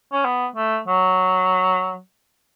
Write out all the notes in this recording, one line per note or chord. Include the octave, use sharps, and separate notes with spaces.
C#4
B3
A3
F#3